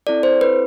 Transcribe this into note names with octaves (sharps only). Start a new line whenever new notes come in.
C4 E4 A4 D5
C5
B4